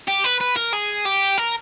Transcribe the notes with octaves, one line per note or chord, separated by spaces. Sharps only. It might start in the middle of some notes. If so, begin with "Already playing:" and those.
G4
B4
B4
A#4
G#4
G4
A#4